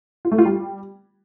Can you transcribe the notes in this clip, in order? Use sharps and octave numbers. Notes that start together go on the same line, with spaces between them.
F4
A3
F4
G3